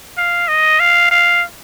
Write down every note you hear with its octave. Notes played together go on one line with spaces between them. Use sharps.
F5
D#5
F5
F5